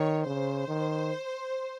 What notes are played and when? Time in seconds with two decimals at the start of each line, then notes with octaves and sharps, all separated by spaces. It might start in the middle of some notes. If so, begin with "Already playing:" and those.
Already playing: D#3 C#5
0.26 C#3 C5
0.68 D#3